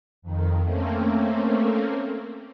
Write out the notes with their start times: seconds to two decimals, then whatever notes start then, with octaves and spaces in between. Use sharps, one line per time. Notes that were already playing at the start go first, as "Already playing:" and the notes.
0.22 F2 D#3
0.63 A3 A#3 C4 C#4